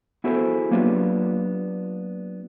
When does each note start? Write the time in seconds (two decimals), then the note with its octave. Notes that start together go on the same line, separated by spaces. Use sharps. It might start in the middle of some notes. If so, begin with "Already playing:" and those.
0.24 B3 E4 F#4 G#4 A4 C5
0.71 F#3 A#3 B3 D4 F4 G4